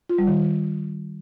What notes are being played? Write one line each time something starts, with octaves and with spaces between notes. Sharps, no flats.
F4
G3
D#3